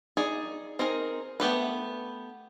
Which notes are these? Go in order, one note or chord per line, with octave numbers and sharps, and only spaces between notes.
D#4 G#4 D5
C4 D#4 G#4 A#4
A3 B3 G4 B4